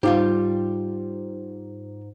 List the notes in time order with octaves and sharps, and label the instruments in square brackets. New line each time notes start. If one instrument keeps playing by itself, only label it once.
[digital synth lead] G#2 [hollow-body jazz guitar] G3 F4 G4